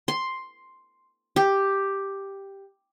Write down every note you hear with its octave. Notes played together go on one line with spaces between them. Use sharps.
C6
G4